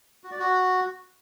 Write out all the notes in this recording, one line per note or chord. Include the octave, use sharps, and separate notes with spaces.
F#4
D5
F#4